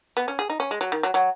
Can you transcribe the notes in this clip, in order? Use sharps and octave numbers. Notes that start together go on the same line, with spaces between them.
B3
C#4
G#4
D#4
C#4
G#3
F#3
D#3
F#3
F#3